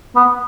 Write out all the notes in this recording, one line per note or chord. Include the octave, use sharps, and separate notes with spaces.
B3